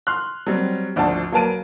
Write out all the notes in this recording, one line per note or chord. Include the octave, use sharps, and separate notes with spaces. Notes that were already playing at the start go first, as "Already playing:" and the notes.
C6 F6 F#6
F#3 G3 C4
G#1 D2 F3 D4 A5
F#3 A#3 B4 A5 D7 D#7